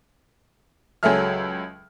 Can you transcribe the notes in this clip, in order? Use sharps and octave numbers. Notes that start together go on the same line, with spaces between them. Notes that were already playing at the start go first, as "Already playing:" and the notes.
C#2 F#3 G#4 A4 E5 F6